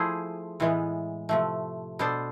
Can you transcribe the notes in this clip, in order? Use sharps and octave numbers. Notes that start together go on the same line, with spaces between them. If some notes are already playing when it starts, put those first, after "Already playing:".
Already playing: F3 A3 E4 G#4 C5
A2 E3 G#3 B3
C3 F3 A3
B2 B3 D4 A4 C5